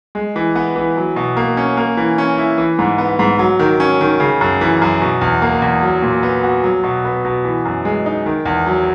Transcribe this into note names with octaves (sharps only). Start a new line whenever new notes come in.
G#3
E3
B3
E3
F#3
B2
A#3
C#4
A#3
E3
C#4
E4
E3
G#2
B3
G#2
F#3
D#3
C#4
D#3
C#3
F#2
E3
F#2
B2
E2
A#3
E2
F#3
A#2
B3
F#4
F#3
B2
B3
B2
E3
F#2
G#3
D#4
D#3
E2
F#3